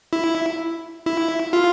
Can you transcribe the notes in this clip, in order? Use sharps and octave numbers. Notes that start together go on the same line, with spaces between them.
E4
E4
F4